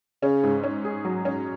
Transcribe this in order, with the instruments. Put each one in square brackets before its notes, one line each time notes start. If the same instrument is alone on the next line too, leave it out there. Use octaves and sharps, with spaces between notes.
[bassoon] C#3 [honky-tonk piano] C#4
[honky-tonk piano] G#2
C#4
G#4
F#3
C#4